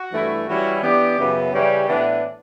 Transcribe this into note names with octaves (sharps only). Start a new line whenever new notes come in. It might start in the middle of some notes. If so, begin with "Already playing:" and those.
Already playing: F#4
G2 E3 A3 E4
E3 G3 C#4 E4 F#4
E3 B3 D4 G4
F#2 C#3 E3 B3
C#3 E3 G3 C#4 G4
A2 E3 B3 D4